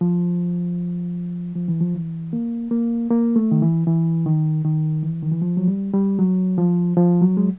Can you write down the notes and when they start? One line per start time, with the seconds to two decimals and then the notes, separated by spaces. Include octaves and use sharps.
0.01 F3
1.55 F3
1.68 E3
1.80 F3
1.94 E3
2.33 A#3
2.71 A#3
3.11 A#3
3.36 A3
3.51 D#3
3.62 E3
3.87 E3
4.26 D#3
4.64 D#3
5.03 E3
5.23 D#3
5.31 E3
5.42 F3
5.57 F#3
5.68 G3
5.94 G3
6.19 F#3
6.58 F3
6.97 F3
7.22 F#3
7.37 G#3